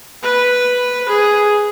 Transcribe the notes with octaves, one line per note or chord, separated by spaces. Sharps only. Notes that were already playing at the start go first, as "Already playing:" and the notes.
B4
G#4